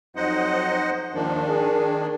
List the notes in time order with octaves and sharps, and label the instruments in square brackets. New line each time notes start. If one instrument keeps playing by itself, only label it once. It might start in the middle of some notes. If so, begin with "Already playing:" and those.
[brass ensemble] F2 F#3 D#4 [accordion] C5 D#5 F#5
[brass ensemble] D#2 G#2 F3 [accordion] D#3 D4
[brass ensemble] G#4